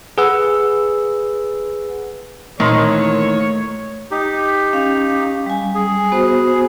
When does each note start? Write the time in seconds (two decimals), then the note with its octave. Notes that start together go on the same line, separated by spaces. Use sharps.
0.18 G#4 B4 F#5 E6
2.60 A#2 D#3 E3 A3 C4 C#5 A5 C6
4.11 D#4 G4
4.73 C#4 F5
5.46 G3 G#5
5.75 G#4
6.12 B3 F#4 C5